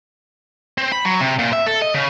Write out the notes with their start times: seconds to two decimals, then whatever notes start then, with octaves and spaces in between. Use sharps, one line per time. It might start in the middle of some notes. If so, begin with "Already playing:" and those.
0.78 C4
0.92 B5
1.05 F#3
1.20 C3
1.39 A#2
1.53 E5
1.66 A4
1.82 D#5
1.94 C#3